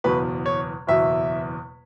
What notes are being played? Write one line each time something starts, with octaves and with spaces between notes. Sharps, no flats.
F#1 E2 B2 B4
C#5
F#1 E2 B2 E5